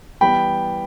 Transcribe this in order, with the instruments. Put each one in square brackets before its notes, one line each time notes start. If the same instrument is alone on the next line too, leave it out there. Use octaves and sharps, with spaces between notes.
[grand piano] E3 G3 B3 G5 B5